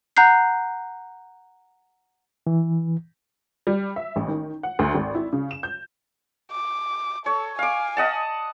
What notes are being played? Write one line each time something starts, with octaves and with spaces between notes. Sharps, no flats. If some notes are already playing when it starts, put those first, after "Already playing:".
F#5 A#5 F#6 G6 C7
E3
G3
E5
A1
D#3
F#5
D2
G#1
E4
C#3
E7
G6
D6
A4 C#5
F5 G#5 D6
D#5 F#5 A5